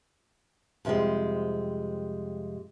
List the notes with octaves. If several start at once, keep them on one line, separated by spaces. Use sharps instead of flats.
F2 C3 D#3 G3 G#3